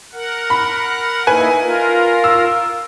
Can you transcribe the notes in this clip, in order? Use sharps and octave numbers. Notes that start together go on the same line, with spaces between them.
A#4 F#5
B5
A#3 D#4 E4 B4 G#5
F4 A#4
E6